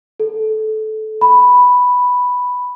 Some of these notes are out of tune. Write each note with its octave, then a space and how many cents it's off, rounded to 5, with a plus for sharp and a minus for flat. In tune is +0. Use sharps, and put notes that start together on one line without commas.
A4 -20
B5 +0